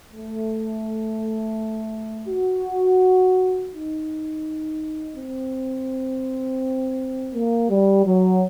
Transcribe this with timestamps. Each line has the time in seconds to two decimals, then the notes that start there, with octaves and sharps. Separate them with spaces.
0.12 A3
2.28 F#4
3.73 D#4
5.17 C4
7.34 A#3
7.70 G3
8.06 F#3